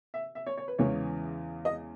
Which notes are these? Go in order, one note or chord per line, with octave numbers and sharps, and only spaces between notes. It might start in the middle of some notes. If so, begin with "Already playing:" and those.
E5
E5
C#5
C#5
B4
E2 C#3 E3 G#3 C#5
D#5